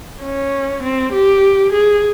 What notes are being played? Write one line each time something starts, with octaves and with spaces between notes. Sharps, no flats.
C#4
C4
G4
G#4